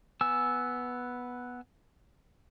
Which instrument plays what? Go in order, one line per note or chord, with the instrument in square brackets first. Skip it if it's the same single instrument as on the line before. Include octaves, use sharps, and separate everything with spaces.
[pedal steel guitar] B3 G#5 E6